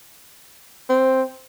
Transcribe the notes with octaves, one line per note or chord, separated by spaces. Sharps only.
C4